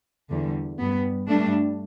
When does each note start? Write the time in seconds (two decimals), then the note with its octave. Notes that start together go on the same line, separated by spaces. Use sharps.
0.30 E2 D3 G3
0.79 G2 G3 B3
1.29 G2 G3 A3 D4